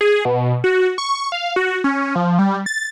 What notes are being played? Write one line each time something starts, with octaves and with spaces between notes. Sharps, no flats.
G#4
B2
F#4
C#6
F5
F#4
C#4
F3
G3
A6